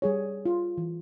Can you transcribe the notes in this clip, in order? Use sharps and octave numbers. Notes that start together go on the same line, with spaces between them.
G3 G#4 C#5
F4
E3